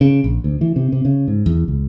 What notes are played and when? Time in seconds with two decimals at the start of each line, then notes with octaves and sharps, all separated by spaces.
0.01 C#3
0.24 A#1
0.44 D2
0.61 E3
0.76 C3
0.92 C3
1.05 C#3
1.28 G#2
1.46 E2
1.68 C#2